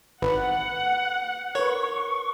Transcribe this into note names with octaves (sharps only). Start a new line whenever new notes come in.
G#1 B4 F#5
A#4 B4 C#5 C#6